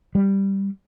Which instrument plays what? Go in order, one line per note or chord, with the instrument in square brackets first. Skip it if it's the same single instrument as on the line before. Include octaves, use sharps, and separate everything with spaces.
[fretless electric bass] G3